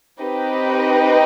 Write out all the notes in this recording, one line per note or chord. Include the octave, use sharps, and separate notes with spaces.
C4 D#4 G4 B4 D#5